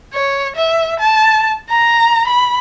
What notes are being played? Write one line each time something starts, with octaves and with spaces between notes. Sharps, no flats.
C#5
E5
A5
A#5
B5